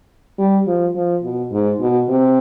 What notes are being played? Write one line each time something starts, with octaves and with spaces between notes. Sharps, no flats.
G3
F3
F3
B2
G#2
B2
C3